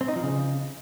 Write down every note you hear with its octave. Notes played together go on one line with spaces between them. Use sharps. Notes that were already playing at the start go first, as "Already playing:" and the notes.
C4
D#4
F3
C#3